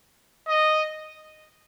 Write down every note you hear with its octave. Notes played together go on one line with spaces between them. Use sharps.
D#5